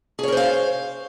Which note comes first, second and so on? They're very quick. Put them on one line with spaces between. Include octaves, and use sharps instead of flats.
G#4 C#5 A#4 C5 F5